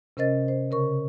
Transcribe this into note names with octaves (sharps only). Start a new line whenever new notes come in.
C3 C#4 A#4 C5 D#5 A6
C5
C#3 A#4 C#6